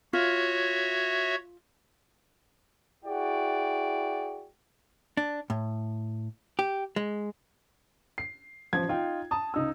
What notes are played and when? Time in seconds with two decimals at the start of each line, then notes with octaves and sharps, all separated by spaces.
0.13 F4 F#4 C#5 E5
3.05 E4 F#4 G#4 D5 G5
5.17 D4
5.50 A2
6.59 G4
6.96 G#3
8.18 C7
8.73 A1 F3 G#6
8.88 D#4 F4 G5
9.31 A5 D#6
9.54 C#2 D#4 E6